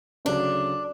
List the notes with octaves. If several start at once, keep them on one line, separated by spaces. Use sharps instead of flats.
D2 C#3 F#3 D4